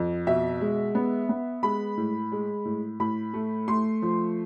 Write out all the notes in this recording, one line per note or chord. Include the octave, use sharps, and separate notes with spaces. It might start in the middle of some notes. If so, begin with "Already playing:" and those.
Already playing: F2
B2 E5
G#3
B3
B3
G#3 B5
A2
G#3
A2
A2 B5
A3
A3 C6
F3